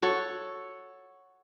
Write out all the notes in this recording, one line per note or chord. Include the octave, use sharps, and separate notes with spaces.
F#4 A4 C#5